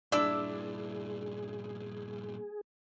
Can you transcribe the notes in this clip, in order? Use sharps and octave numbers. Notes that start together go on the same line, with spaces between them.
G2 A#2 D4 E4 G#4 D6 E6